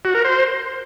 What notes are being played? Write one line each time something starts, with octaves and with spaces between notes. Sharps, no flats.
F#4
A#4
C5